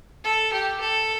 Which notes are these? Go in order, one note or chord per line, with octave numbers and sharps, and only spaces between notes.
A4
G4
A4